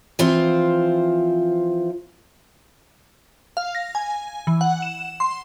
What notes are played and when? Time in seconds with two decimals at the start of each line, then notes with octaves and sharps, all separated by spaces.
0.19 E3 F3 C4 F4 C5
3.57 F5
3.75 A#6
3.95 G#5
4.47 E3
4.61 F#5
4.82 E7
5.20 C6